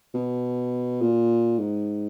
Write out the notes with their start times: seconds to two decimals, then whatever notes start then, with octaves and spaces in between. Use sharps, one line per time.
0.14 B2
1.02 A#2
1.59 G#2